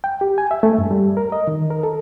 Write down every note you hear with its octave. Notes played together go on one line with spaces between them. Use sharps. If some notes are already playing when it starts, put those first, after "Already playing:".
G5
G4
G#5
E5
A3
G2
G3
A#4
D#5
D#3
A#4
A4